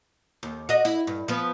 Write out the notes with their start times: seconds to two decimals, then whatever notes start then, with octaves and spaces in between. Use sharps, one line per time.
0.43 D#2
0.69 F#4 D#5
0.85 E4
1.07 G2
1.28 F3 B3